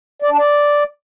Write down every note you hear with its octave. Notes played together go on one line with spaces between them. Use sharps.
D5
D4
D5